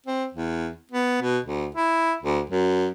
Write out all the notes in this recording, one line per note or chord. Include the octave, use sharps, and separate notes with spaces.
C4
E2
B3
B2
D2
E4
D2
F#2